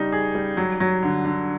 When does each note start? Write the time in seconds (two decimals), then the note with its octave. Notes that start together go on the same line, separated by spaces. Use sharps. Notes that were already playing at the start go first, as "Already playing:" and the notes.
Already playing: C#3 G3 D#4
0.12 G#4
0.35 G3
0.57 F#3
0.80 F#3
1.03 D3
1.25 D3